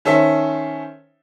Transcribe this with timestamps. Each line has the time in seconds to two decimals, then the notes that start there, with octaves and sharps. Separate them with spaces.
0.05 D#3 C#4 A4 C5 E5